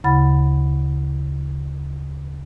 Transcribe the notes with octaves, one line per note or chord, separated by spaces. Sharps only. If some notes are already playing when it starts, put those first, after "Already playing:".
D2 C#3 E4 F#5 B5 A6